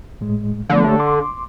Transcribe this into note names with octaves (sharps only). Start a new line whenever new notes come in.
A2 G#3
D3 F3 A3 B3
A3 G4 C#5
C6 D6